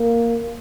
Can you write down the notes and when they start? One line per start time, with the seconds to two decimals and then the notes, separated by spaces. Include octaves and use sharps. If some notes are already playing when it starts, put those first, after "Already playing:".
Already playing: A#3